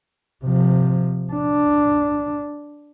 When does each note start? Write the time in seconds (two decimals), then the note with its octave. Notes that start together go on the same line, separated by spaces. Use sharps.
0.45 C3 F3
1.33 D4